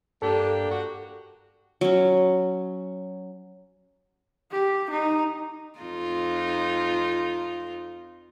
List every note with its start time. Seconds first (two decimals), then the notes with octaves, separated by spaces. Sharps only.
0.22 G2 A#3 D4 G4 A4
0.71 F#4
1.81 F#3 C#4
4.52 G4
4.90 D#4
5.80 F2 D#4 F4